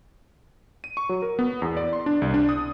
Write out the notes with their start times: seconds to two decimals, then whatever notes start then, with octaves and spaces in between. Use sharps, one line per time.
0.84 D#7
0.97 C#6
1.09 F#3
1.22 A#4
1.39 B3
1.62 E2
1.77 D5
1.93 C6
2.06 D4
2.22 C2
2.34 D4
2.49 D#6